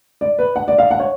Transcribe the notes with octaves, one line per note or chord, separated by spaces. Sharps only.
D5
B4
F#5
D5
F5
F#5
C#5